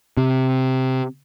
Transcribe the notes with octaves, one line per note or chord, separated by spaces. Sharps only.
C3